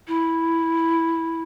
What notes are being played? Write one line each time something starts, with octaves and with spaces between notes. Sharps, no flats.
E4